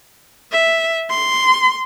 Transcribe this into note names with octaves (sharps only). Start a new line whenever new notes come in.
E5
C6